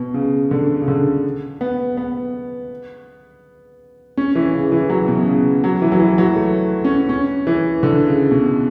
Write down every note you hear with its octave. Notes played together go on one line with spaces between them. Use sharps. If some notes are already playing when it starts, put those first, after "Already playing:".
Already playing: B2
C#3
D3
C#3
D3
B3
B3
C#4
E3
C#3
E3
F#3
B2
C#3
F#3
E3
F#3
E3
F#3
A3
C#4
C#4
E3
D3
C#3
B2